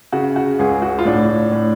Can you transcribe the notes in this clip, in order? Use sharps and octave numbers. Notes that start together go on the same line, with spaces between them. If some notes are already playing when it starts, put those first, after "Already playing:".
C#3 F#4
F#4
C#2 G#4
F#4
F4
A2 D4
A2